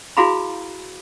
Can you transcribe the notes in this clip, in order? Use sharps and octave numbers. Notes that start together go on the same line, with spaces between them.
E4 F#4 G#4 F5 A#5 B5